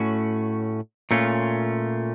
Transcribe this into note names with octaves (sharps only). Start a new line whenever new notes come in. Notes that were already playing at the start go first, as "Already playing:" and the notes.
Already playing: A2 A3 C#4 F#4
A#2 A3 C#4 F4